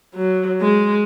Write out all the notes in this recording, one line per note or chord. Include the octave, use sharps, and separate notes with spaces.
F#3
G#3